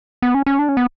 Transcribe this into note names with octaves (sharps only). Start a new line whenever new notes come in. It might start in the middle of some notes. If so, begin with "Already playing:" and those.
B3
C#4
C#4
D4
C#4
B3